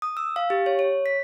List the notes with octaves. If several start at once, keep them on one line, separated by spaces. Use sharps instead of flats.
D#6
E6
F5
G4
C#5
C#5
B6